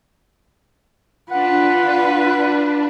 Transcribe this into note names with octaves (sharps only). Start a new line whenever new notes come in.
D4 F4 B4 F#5